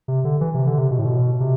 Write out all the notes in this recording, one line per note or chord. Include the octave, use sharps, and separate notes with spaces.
C3
D3
E3
C3
D3
C3
B2
A2
B2
C3